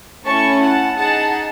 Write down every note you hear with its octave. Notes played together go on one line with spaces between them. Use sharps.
A3 C#4 E4 A5 C#6
F#5 A5
D#4 G#4 F#5 A5